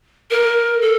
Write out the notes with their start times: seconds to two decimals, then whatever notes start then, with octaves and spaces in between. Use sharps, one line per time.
0.31 A#4
0.81 A4